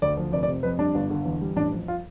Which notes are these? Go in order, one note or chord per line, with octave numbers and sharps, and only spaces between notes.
D2 D5
F3
F1 D5
D5
C3
F2 B4
G3 D4
G1
D3
E2
G3
A1 D4
F3
F4